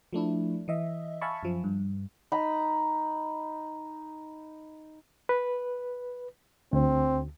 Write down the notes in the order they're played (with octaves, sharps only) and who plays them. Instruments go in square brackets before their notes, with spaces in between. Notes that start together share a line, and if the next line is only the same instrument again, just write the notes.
[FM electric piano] F3 A3 D4 E4
E3 D#5 E5
E5 F5 G#5 A5 B5 C#6
F#2 F3
G2
[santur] D#4 A#5 B5
[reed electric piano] B4
[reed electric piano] D2 [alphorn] C4